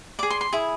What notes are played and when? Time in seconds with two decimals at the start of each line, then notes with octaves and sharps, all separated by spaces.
0.19 G#4 D5 D6
0.30 C6
0.41 C6
0.53 E4 G#4